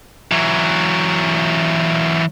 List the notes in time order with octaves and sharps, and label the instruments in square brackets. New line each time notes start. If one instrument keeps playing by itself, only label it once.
[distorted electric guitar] E3 F#3